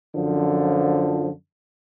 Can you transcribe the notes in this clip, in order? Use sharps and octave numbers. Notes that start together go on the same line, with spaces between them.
F#2 D3 F3